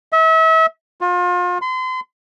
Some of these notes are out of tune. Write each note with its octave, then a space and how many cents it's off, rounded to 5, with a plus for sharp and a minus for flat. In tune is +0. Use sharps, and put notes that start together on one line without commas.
E5 -35
F4 +35
C6 -35